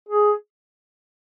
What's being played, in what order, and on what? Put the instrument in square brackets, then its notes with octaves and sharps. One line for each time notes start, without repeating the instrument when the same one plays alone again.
[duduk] G#4